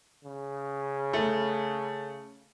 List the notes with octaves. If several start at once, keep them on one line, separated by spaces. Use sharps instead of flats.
C#3
A3